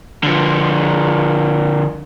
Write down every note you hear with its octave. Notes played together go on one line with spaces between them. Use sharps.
D3 F3